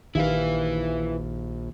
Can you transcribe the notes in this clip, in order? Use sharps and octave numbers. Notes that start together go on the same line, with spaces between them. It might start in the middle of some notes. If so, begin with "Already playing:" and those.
A#1 D#3 E4 G4 B4 F5